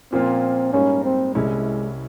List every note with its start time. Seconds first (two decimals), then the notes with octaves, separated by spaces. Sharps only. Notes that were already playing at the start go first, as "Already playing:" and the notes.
0.12 A#2 F3 A#3 C4 C#4 F4
0.73 G#2 G3 A#3 C#4
1.04 C4
1.35 C2 C3 G3 G#3 C#4 E4